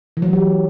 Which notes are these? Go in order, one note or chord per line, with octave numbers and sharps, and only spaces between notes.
E3
F#3
G#3
G4